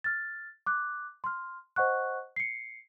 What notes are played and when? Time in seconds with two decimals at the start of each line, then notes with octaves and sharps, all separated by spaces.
0.04 F6 A6
0.66 D6 F#6
1.24 C6 F6
1.76 C5 D#5 F#5 C#6 F#6
2.36 C7 C#7